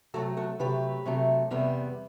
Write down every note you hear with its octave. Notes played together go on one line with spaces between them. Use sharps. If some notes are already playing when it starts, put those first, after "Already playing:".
C3 F#3 A3 F#4 A4
F#4 A4
C3 F#3 A3 G4 B4
C3 F#3 A3
E2 C3 G3 B3